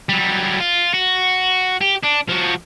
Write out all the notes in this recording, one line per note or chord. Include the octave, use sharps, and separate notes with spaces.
F#3 G3
F4
F#4
G4
D4
F3 F#4